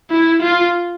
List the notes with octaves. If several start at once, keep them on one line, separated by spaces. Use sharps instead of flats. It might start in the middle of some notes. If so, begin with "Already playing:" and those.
E4
F4